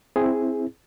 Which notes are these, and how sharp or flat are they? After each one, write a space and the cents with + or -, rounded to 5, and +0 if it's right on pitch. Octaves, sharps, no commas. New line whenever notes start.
C4 +5 E4 +0 G#4 +0